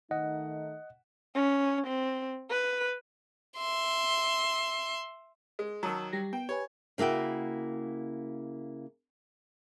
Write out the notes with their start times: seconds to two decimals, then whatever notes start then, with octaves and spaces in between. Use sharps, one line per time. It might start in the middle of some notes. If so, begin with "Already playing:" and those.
0.11 D#3 A3 D#4 D#5 F#5
1.35 C#4
1.87 C4
2.50 B4
3.57 E5 C6
5.59 G#3
5.83 D#3 F#3 A5 D#6 E6
6.13 G3 G4 A#6
6.33 B3 G5
6.49 G4 B4 C#5 G#5
6.98 C#3 A#3 E4 F#4 G5